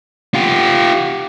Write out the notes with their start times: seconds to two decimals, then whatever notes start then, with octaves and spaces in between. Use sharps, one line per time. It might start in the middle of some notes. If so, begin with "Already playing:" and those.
0.34 F4 G4